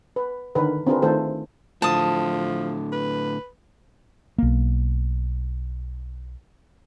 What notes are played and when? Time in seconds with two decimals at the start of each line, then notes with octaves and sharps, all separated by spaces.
0.16 B4
0.55 D3 D#3 A#4 B4
0.87 C4 D4 F4 G#4 A#4 B4
1.02 D#3 A3 F4 A4 C5
1.82 A2 D3 F3 A5 D#6
2.92 B4
4.38 B1 A#3